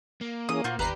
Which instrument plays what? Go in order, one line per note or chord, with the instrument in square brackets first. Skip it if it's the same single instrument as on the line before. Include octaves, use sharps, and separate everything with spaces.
[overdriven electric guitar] A#3
[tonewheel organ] E3 C#4 G#4 [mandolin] D#6
[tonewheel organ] A#2 [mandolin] F4 F#4 C5
[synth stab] G1 A#5 C7 [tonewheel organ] D#2 [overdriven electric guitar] G4 D5 [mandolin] B4